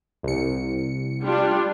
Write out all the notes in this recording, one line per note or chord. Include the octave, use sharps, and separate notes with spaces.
C2 C#7
G3 D4 F4